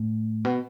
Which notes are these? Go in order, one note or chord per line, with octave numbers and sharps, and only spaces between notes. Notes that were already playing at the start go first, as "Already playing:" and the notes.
Already playing: A2
B2